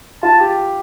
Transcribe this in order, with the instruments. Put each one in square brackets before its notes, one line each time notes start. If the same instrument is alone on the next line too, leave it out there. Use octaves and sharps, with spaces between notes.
[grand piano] F4 [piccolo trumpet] A5
[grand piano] G4